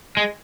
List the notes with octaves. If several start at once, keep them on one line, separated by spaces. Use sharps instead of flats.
G#3